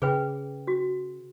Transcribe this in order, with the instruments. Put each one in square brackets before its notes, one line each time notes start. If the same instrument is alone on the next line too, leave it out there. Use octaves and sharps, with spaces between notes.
[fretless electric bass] C#3 [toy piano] G#4 B4 G5
[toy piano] F#4